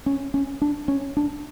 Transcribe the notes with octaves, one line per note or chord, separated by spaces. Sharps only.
C#4
C#4
D4
C#4
D4